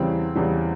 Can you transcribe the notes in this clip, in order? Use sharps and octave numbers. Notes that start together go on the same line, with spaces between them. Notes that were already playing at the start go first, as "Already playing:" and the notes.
Already playing: E2 C#3 E3 G3 C4
E2 C#3 E3 G3